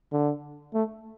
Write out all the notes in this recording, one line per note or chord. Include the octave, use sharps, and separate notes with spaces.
D3
A3